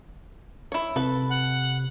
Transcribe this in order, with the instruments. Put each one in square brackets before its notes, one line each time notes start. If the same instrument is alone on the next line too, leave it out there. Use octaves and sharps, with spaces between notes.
[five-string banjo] E4 C#5
[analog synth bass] C3 [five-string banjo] A4 B4
[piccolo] F#5